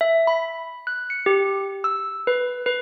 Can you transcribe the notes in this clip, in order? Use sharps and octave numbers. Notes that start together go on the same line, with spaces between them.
E5
B5
F#6
C#7
G4
E6
B4
B4